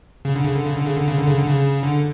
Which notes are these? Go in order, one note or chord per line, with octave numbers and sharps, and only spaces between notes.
C#3
D3
C#3
D3
C#3
D3
C#3
D3
C#3
D3
C#3
D3
C#3
D3